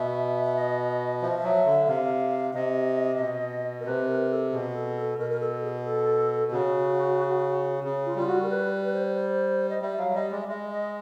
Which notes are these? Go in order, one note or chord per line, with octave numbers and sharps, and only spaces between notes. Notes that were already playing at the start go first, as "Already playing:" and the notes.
Already playing: B2 E5
E5
D#5
F3 E5
D#5
E5
F#3
D3
C3 F5
C3 D#5
B2
A#4
C3 B4
A#4
A4
B2 G#4
A4
A4
B2 A#4
A#4
A4
G#4
A4
C#3 F#4
C#3
F4
G3 F4
F#4
A#4
B4
B4
C5
C5
D#5
G3 E5
F#3 F5
E5
G3 D#5
G#3 D5
E5
G#3 D#5
D#5